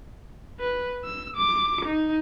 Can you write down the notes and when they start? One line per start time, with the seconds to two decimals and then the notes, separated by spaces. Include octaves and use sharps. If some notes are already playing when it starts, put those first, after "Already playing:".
0.60 B4
1.04 E6
1.36 D6
1.85 D#4